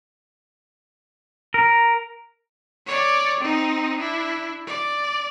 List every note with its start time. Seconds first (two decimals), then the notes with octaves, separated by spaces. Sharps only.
1.54 A#4
2.86 C#5 D5
3.40 C4 D#4
3.97 D4 E4
4.67 D5